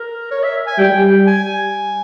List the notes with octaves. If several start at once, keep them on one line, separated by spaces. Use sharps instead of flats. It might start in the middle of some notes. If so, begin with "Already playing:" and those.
Already playing: A#4
C#5
E5
G#5
G3 G5
G#5